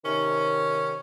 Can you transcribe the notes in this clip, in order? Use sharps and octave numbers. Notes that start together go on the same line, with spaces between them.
C3 D#3 C#4